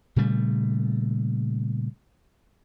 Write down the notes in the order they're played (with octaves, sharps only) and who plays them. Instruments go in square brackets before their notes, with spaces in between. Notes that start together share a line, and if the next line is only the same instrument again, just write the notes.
[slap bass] A#2 C#3 G3 A3